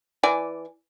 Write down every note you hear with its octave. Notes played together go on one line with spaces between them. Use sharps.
E3 D5 G#5